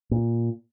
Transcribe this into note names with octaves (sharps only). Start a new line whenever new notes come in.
A#2